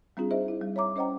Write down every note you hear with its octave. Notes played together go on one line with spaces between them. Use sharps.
G3 C4 D4 F4 G#4
D#4 G#4 C5 D#5 E5
E4
G3
C#5 E5 A#5 D6
C#4 C5 D#5 F#5 G5 A#5